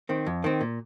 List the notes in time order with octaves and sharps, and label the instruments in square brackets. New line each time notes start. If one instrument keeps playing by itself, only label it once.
[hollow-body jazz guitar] D#3 C4
F2
D#3 C4
A#2